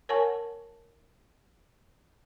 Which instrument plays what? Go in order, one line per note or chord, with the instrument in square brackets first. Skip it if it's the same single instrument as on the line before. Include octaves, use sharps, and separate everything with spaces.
[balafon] A#4 C#5 F#5 G#5 A5 C#6